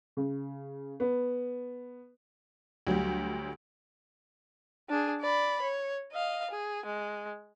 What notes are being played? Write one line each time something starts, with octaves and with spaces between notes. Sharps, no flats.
C#3
B3
D2 F#3 G3 G4
D4 G#4
D5 B5
C#5
D#5 F5
G#4
G#3